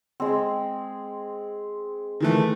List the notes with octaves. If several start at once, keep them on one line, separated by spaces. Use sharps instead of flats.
G#3 C4
D#3 E3 A3